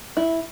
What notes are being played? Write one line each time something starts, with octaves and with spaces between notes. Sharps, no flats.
E4